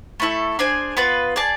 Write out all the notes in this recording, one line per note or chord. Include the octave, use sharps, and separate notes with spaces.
A3 E4 A4
D4 G#4 C5 G#5
B3 F4 B4
G#4 D5 A5